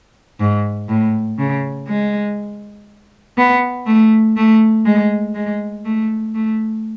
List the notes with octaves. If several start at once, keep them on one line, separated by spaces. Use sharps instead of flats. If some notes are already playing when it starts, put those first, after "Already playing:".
G#2
A2
C#3
G#3
B3
A3
A3
G#3
G#3
A3
A3